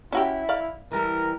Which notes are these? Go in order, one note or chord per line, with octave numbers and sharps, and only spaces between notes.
C#4 E4 F#4 G4
D5 F5
E3 G3 A#4